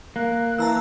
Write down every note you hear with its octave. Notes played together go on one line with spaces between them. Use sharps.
A#3 F#6
E3 A5 A#5 E6